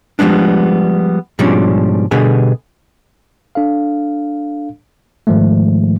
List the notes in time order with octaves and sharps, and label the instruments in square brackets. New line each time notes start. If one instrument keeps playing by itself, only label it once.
[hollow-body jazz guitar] F3 G3 G#3 B3 D4
G#2 B2 F3 G3 C#4 D4
B2 D3 G3 B3 G#4
[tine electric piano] D4 A4 F5
G#2 D#3 F3 G#3 A3